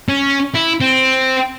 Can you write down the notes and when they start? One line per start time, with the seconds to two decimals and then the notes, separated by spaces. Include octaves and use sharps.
0.09 C#4
0.55 E4
0.81 C4